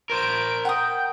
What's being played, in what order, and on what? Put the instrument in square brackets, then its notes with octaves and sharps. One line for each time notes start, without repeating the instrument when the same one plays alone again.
[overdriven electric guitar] A#4 C5 [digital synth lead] D7
[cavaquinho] F#5 D#6 [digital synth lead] G5